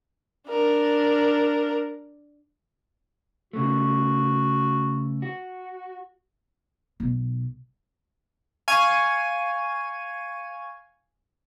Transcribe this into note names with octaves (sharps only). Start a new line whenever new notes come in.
D4 A#4
C#3 A3 F#4
F#4
B1
F5 G#5 C#6 G#6 D#7